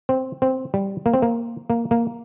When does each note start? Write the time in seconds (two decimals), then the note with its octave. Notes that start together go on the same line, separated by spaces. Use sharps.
0.09 C4
0.42 C4
0.74 G3
1.06 A#3
1.14 C4
1.22 A#3
1.70 A#3
1.91 A#3